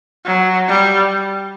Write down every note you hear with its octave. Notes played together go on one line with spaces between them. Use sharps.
F#3
G3